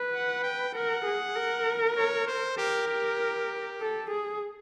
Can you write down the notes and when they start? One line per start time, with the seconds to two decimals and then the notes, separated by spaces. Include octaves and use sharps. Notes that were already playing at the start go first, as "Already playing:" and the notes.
Already playing: B4
0.13 F#5
0.43 G5
0.74 A#4 F#5
1.05 G#4
1.35 A#4
1.97 C#5
2.27 C5
2.58 G4 A#4
2.88 G4
3.80 A4
4.10 G#4